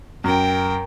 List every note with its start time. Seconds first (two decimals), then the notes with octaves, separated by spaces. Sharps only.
0.24 F#2 A#4 G5